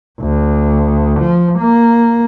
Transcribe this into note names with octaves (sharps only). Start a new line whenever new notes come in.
D2
F3
A#3